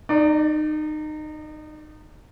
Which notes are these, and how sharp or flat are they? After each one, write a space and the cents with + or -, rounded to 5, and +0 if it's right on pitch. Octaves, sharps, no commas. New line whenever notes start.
D#4 -25 D5 +15